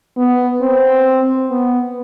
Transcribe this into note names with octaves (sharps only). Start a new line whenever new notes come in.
B3
C4
B3